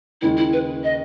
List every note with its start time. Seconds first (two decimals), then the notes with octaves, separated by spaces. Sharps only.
0.22 D#2 C#3 G#3 E4
0.37 E4
0.53 B4
0.84 D#5